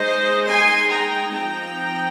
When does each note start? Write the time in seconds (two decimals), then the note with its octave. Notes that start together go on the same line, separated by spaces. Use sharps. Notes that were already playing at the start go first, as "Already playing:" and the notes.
Already playing: G#3 D#4 C5 D#5
0.47 G#5 C6
0.90 G5 A#5
1.33 F3 C4 D#4 G5 A#5